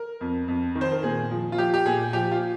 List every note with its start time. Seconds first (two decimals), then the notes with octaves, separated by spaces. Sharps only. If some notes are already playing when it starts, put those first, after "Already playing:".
Already playing: A#4
0.21 F2
0.48 F2
0.75 D#3
0.81 C5
0.92 A#4
1.03 A#2 G#4
1.31 F3
1.52 F4
1.58 F3 G4
1.74 G4
1.86 A#2 G#4
2.13 F3 G4
2.31 F4